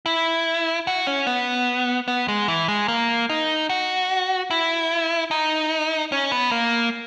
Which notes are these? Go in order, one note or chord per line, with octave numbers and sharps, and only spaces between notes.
E4
F#4
C#4
B3
B3
G#3
E3
G#3
A#3
D#4
F#4
E4
D#4
C#4
B3
A#3